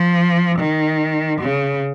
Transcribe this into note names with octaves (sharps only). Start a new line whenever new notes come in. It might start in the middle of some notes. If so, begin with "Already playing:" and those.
Already playing: F3
D#3
C#3